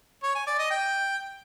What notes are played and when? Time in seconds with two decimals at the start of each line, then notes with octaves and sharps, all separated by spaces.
0.23 C#5
0.35 G#5
0.47 D5
0.59 D#5
0.71 G5